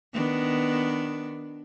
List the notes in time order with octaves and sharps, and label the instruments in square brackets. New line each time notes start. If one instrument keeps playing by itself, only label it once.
[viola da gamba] D#3 B3 D4